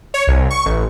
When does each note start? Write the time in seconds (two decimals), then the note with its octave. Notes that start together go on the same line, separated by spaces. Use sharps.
0.14 C#5
0.27 C2
0.50 C#6
0.66 A1